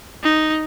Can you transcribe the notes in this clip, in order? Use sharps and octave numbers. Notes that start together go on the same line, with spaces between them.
D#4